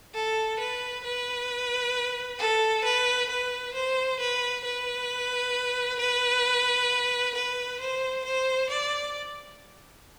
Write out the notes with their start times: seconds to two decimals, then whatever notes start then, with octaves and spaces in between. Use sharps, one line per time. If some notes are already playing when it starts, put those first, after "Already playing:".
0.14 A4
0.59 B4
1.04 B4
2.39 A4
2.84 B4
3.29 B4
3.74 C5
4.19 B4
4.64 B4
5.99 B4
7.35 B4
7.80 C5
8.25 C5
8.70 D5